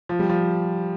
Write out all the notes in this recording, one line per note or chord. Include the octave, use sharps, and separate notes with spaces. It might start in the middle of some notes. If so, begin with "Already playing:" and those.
F3
G3
F3